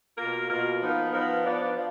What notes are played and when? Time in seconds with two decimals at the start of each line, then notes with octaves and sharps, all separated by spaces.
0.18 B2 A#3 F4 A#4
0.49 B2 A#3 F4 A#4
0.81 F3 B3 D#4 A#4
1.12 F3 B3 D#4 A#4
1.43 F3 B3 D4
1.75 F3